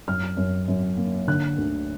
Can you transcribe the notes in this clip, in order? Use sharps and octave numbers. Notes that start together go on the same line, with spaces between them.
F#2 F6
F#2
F#2
A#3
D3 F#6
D2